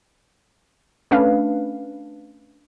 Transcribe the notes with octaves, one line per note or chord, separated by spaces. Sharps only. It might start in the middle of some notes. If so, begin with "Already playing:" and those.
A3 C#4 D4 B4 F5